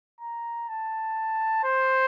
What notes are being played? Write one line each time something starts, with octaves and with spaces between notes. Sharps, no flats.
A#5
A5
C5